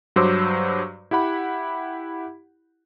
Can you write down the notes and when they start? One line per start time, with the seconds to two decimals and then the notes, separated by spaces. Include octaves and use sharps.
0.16 G2 F#3 C5 C6 D6 E6
1.11 E4 G4 F#5 B5